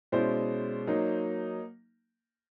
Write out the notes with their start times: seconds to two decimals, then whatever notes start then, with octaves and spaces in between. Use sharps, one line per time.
0.12 B2 G#3 C#4 E4 C5 D5
0.87 F#3 A#3 D#4